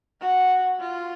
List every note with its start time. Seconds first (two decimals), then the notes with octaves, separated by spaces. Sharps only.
0.21 F#4
0.79 F4